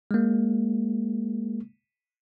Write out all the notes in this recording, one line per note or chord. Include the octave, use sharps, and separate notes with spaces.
G#3 A#3